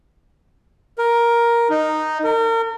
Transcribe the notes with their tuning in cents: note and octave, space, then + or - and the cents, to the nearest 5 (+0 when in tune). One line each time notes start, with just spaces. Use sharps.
A#4 +10
D#4 -5
A#4 -35